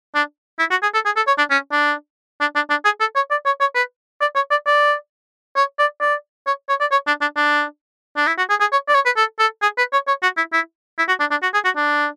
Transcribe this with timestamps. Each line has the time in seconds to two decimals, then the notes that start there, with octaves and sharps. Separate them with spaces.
0.15 D4
0.59 E4
0.71 F#4
0.83 G#4
0.94 A4
1.05 G#4
1.16 A4
1.27 C#5
1.38 D4
1.51 C#4
1.72 D4
2.41 D4
2.55 D4
2.70 D4
2.85 G#4
3.00 A4
3.16 C#5
3.31 D5
3.46 C#5
3.61 C#5
3.75 B4
4.21 D5
4.35 C#5
4.51 D5
4.66 D5
5.56 C#5
5.79 D5
6.01 D5
6.47 C#5
6.69 C#5
6.80 D5
6.92 C#5
7.07 D4
7.21 D4
7.36 D4
8.17 D4
8.27 E4
8.38 F#4
8.50 G#4
8.61 G#4
8.72 C#5
8.88 D5
8.95 C#5
9.06 B4
9.17 A4
9.39 A4
9.62 G#4
9.78 B4
9.93 C#5
10.08 C#5
10.23 F#4
10.37 E4
10.53 E4
10.98 E4
11.08 F#4
11.20 D4
11.31 D4
11.43 F#4
11.54 G#4
11.65 F#4
11.76 D4